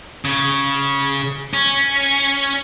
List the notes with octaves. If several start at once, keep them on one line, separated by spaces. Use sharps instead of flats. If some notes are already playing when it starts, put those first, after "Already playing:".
C#3
C#4